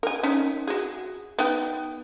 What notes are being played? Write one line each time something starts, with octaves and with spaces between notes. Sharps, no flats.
A#4 G#5
C#4 D#4
F#4 G#4
B3 D#4 G5